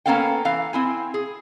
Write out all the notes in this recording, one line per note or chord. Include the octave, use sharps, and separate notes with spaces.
A#3 B3 C#4 A4 F5 G5
E3 F5
C4 E4 G#5
G#4